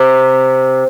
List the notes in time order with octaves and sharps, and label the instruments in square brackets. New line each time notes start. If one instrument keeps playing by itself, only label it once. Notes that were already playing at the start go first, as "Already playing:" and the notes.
Already playing: [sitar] C3